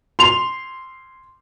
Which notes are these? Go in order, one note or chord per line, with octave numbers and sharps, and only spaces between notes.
C6 F7